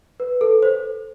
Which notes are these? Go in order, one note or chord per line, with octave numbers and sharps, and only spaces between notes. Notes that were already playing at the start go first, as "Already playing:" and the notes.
B4
A4
C5